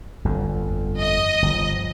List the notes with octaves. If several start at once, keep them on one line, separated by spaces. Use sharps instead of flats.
G1 F2 D3
D#5
G1 F3